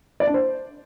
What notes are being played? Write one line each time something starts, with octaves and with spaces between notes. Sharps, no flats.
D5
D4
C5